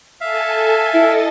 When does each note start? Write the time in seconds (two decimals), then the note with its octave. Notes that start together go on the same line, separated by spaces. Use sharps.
0.21 A4 E5 F5 G#5 A5
0.94 E4 A4 D#5 A6